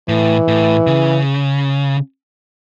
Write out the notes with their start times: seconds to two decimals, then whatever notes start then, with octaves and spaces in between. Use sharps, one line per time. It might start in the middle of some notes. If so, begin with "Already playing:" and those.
0.09 A2 E3
0.48 A2
0.87 C#3